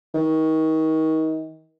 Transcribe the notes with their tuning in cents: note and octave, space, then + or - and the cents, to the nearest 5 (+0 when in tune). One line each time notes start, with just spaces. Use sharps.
D#3 +30